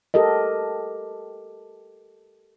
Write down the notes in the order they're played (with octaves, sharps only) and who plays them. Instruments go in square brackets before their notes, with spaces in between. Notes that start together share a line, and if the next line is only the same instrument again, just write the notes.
[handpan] G4 A4 A#4 D#5